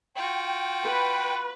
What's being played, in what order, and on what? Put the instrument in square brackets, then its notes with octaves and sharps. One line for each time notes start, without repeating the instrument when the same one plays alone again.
[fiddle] F4 F#4 [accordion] G5
[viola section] B4